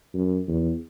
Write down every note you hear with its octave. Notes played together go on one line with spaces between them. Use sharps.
F#2
E2